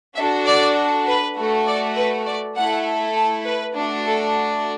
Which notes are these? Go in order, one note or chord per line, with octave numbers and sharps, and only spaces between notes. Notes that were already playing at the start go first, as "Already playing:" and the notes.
D4 F#4 A4 E5
D5
B4
A3 F#4 A4
D5
B4
D5
A3 E4 A4 F#5
A5
B4
A3 D4 F#4
A4